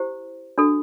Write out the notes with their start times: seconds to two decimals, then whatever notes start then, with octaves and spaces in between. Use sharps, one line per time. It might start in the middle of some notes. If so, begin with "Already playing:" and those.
Already playing: E4 G4 C5
0.58 D4 F#4 A4